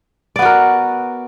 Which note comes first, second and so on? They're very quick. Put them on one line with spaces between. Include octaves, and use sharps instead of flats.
D5 B3 F#4 A#4